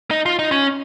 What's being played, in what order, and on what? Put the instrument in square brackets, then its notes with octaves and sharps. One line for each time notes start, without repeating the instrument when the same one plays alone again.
[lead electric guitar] D#4
F4
D#4
C#4